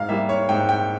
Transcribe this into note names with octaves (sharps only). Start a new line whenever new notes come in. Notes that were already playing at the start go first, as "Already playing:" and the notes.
Already playing: G#2 F5
G3 A#3 E5
C#5
G#2 G5
G5